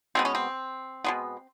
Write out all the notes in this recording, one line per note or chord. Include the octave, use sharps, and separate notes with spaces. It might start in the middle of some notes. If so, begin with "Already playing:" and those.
B2 G#3 B3 C4
C#4
C4
B2 G#3 B3